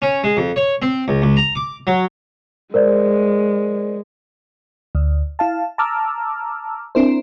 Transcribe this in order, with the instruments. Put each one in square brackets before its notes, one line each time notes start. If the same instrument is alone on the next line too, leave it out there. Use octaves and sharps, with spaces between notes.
[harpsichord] C#4
G#3
F2
C#5
C4
C#2
C#2
A#5
D6
F#3
[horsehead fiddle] G#3 [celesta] A#4 C5 D5
[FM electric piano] D2
E4 F5 A5
A5 A#5 D6 E6 F6
C4 D4 E4 A#4 C5